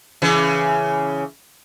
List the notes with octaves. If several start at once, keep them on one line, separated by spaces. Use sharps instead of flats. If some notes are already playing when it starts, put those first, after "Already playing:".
C#3 E3